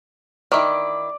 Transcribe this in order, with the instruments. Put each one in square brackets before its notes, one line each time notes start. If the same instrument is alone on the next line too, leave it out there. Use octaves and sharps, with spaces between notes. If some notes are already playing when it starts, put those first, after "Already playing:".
[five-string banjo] D#3 E4 [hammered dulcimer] D5